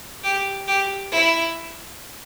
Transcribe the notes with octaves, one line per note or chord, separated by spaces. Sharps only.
G4
G4
E4